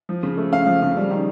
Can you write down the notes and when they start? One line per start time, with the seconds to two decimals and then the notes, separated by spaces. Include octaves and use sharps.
0.09 F3
0.23 C#3
0.37 A3
0.52 C#4 F5
0.67 F3
0.82 C#3
0.97 G3
1.11 D#3